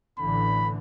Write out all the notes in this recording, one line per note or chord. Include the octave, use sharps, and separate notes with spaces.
A1 D3 E3 B5